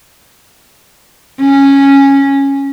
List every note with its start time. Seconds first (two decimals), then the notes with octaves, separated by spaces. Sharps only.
1.41 C#4